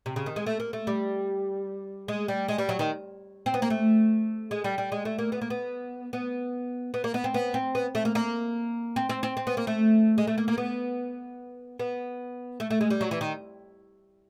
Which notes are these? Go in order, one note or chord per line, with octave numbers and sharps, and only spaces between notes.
C3
C#3
D#3
G#3
A3
A#3
A3
G3
G#3
G3
G#3
G3
F#3
D#3
C4
B3
A#3
A3
G#3
G3
G3
G#3
A3
A#3
B3
A#3
B3
B3
B3
A#3
B3
C4
B3
C4
B3
A3
A#3
A#3
C4
C4
C4
C4
B3
A#3
A3
G#3
A3
A#3
A#3
B3
B3
A3
A3
G#3
G3
F#3
E3
D#3